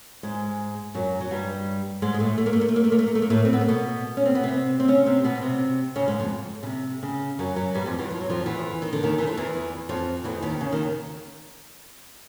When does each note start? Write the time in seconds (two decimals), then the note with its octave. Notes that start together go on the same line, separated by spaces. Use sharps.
0.23 G#2 G#3
0.94 F#2 F#3
1.21 F#3
1.31 G2 G3
2.02 G#2 G#3
2.14 G#3
2.20 A2 A3
2.38 A3
2.46 A#3
2.53 A3
2.61 A#3
2.68 A3
2.76 A#3
2.84 A3
2.92 A#3
2.99 A3
3.07 A#3
3.15 A3
3.22 A#3
3.30 A2 A3
3.45 C4
3.53 B3
3.61 A#3
3.69 B2 B3
4.17 C#4
4.26 C4
4.35 B3
4.44 C3 C4
4.80 C4
4.88 C#3 C#4
5.06 C3 C4
5.24 B2 B3
5.41 C3 C4
5.96 C#3 C#4
6.08 G#2 G#3
6.20 F2 F3
6.63 C#3
6.67 C3
7.03 C#3
7.39 F#2 F#3
7.56 F#2 F#3
7.74 G2 G3
7.86 F2 F3
7.98 E2 E3
8.11 F3
8.21 F#3
8.30 F2 F3
8.46 E2 E3
8.82 D#3
8.93 D3
9.03 D#2 D#3
9.18 E3
9.27 F3
9.37 E2 E3
9.89 F2 F3
10.24 E2 E3
10.43 D#2 D#3
10.61 C#3
10.72 D#2 D#3